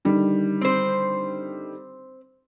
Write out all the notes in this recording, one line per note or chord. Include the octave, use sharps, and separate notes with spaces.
D3 D#3 G3
C4 C5